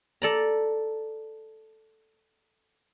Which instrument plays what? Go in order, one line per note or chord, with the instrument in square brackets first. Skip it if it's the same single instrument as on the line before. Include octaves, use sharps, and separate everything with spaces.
[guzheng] A4 D5 A#5